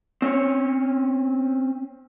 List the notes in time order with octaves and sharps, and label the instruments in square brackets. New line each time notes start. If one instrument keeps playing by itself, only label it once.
[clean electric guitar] C4 C#4 C#5